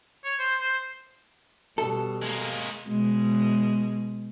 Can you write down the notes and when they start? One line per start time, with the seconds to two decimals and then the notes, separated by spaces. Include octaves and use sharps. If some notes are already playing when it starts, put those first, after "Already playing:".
0.25 C#5
0.39 C5
0.61 C5
1.78 B2 G3 A4
2.22 G#3 A#3
2.88 B2 G#3